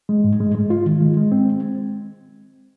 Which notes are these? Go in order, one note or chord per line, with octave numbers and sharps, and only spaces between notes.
G#3
G#2
G#3
G#3
F4
D#3
G#3
G#3
C4